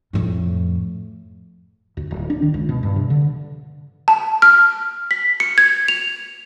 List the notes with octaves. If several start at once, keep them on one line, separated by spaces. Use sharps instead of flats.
F2 A2
D2
D1
D4
D#3
C#2
B2
G2
C3
D3
A5
F6
B6
C#7
G#6
F7